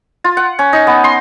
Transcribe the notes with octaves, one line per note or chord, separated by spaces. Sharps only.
F4
F#5
C#4
D#4
B3
C6